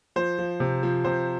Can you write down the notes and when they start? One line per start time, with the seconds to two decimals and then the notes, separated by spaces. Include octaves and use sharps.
0.16 F3 C5
0.39 F3
0.60 C3
0.83 F3
1.05 C3 C5